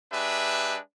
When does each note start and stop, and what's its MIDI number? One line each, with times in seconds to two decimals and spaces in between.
0.12 0.78 56
0.12 0.78 62
0.12 0.78 67
0.12 0.78 71
0.12 0.78 76